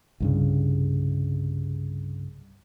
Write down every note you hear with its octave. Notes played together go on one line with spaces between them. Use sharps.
C2 G2 C#3